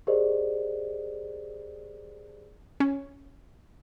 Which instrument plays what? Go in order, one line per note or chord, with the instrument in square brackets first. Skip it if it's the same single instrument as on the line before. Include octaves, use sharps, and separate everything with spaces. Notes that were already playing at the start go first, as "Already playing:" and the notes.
[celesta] G4 G#4 A#4 C5 D5 D#5
[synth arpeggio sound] C#4